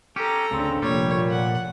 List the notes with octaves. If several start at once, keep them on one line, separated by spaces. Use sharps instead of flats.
C#4 G4 A4 A#5
D2 C#3 C4 D4
F1 A#2 G3 C#5
F#5